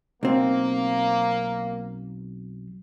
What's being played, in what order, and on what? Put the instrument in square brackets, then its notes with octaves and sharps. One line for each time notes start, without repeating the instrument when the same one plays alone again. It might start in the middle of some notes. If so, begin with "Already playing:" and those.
[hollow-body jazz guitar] B1 C4 [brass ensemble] A#3